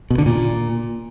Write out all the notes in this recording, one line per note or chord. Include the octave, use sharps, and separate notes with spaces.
B2
D3
A#2